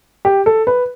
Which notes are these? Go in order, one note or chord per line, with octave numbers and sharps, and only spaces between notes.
G4
A4
B4